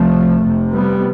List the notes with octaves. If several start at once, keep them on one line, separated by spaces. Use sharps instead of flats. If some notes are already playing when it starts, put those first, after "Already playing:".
Already playing: C2 C3 F3 A3
F1 F2 C3
G3 B3